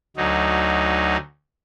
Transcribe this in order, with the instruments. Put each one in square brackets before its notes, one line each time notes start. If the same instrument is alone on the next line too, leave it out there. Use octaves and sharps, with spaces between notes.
[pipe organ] D2 F#3 D#4